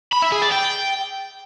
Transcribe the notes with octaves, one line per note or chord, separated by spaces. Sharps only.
B5
E5
G#4
D5
G5